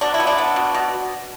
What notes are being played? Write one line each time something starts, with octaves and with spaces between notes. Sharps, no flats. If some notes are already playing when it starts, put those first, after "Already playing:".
B2 D4
E4
B3
D4
B3
B2
B2